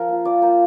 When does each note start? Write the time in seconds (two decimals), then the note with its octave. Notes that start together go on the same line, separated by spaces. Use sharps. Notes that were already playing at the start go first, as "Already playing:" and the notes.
Already playing: F3 A#4
0.09 A#3 F4
0.25 F3 D5
0.42 A#3 F4 G5